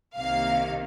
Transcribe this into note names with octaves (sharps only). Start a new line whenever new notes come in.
C2 C3 D#3 A#3 F5